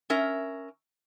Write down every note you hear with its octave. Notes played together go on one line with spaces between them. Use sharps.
C#4 A#4 E5